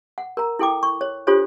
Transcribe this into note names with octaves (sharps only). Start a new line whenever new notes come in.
F#5
A#4 A#5
E4 A4 G5 D6
C#6
C#5
D4 F4 G4 A4 C5 C#5